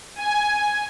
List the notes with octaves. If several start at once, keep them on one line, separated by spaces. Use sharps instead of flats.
G#5